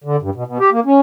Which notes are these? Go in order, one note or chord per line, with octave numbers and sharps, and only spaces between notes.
D3
G2
B2
B2
G4
A#3
C#4